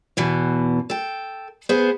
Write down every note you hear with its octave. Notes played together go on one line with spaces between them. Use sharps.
E2 B2 E3
A4 G5
B3 G#4 C5